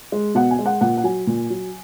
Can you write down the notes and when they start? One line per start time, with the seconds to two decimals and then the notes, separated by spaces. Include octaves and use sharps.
0.12 G#3
0.35 B2 F#5
0.51 G#5
0.59 G#3
0.66 F#5
0.81 A#2 F#5
0.97 F#5
1.04 F#3 G#5
1.27 A#2
1.50 F#3